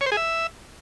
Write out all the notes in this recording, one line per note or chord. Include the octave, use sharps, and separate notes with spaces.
C#5
C5
G#4
E5